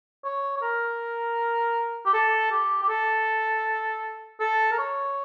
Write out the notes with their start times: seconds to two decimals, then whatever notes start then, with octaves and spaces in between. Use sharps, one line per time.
0.24 C#5
0.57 C#5
0.62 A#4
2.06 G4
2.13 A4
2.51 G4
2.83 G4
2.89 A4
4.40 A4
4.71 A#4
4.79 C#5